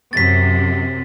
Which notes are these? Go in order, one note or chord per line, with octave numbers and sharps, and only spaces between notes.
F#2 C3 A6 B6